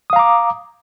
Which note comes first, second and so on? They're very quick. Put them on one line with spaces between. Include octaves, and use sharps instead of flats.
D#6 F5 A#5 D6